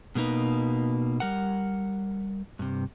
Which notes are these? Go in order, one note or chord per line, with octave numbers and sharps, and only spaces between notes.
B2 G#3 A#3 D#4 B4
G3 A#4 F#5
G2 C3